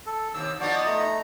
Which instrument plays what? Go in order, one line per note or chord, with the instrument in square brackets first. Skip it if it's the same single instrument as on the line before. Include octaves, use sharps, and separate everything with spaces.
[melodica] A4
[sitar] D#2 C3 [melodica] E6
[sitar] F3 B3 D#4 [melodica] F#4 D5
[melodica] A3 A#5